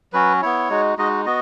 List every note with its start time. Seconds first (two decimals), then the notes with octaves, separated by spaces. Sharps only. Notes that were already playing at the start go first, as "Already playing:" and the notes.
0.13 F#3 C#4 F#4 B4
0.42 B3 E4 C#5
0.70 G#3 D#4 F#4
0.97 G#3 D#4 F#4 D#5
1.25 B3 F#4 D#5